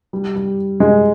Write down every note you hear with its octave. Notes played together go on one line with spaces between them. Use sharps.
G3
G3
G#3